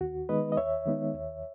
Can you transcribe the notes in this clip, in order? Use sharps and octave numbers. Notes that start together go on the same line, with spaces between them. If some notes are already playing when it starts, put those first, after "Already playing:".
D#2 F#4
D#3 G#3 B3 D#4 B4 D#5
D#5
D#2 C#5 E5
D#3 G#3 B3 D#4
D#2